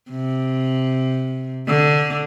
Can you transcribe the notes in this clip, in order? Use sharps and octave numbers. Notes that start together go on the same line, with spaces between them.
C3
D3